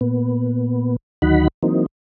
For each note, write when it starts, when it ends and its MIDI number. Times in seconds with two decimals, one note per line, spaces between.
0.01 0.96 46
0.01 0.96 59
1.22 1.48 38
1.22 1.48 51
1.22 1.48 54
1.22 1.48 63
1.22 1.48 78
1.22 1.48 83
1.63 1.86 52
1.63 1.86 54
1.63 1.86 58
1.63 1.86 60
1.63 1.86 63